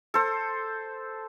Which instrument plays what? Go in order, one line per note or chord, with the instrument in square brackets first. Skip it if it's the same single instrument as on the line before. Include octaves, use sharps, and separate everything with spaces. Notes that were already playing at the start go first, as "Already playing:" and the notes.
[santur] A4 C5